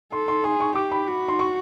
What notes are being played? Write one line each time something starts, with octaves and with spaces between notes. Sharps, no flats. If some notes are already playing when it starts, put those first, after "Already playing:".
A4 C6
C6
G#4 C6
C#6
G4 D6
B5
F#4
C6
C#6